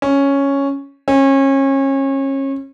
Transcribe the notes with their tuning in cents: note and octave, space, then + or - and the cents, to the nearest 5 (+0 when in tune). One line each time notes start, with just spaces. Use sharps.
C#4 +0
C#4 -30